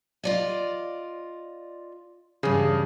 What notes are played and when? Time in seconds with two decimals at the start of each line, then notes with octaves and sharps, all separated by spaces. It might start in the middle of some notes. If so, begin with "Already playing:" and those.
0.23 F4 D5 D#5
2.43 E2 G2 C#3 G#4